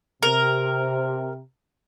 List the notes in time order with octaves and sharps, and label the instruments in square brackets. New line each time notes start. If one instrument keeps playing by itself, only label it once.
[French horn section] C3 [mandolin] A#4